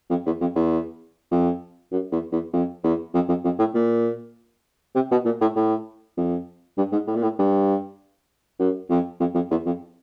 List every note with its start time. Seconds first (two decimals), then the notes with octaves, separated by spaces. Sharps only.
0.10 F2
0.26 E2
0.41 F2
0.56 E2
1.31 F2
1.92 F#2
2.12 E2
2.32 E2
2.54 F2
2.84 E2
3.14 F2
3.29 F2
3.45 F2
3.59 A2
3.75 A#2
4.95 C3
5.11 B2
5.25 A#2
5.41 A2
5.56 A2
6.17 F2
6.78 G2
6.92 G#2
7.07 A2
7.15 A#2
7.23 A2
7.39 G2
8.59 F#2
8.90 F2
9.20 F2
9.35 F2
9.51 E2
9.66 F2